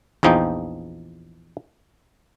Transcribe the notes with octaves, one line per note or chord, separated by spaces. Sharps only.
A#1 E2 F3 D#4 G5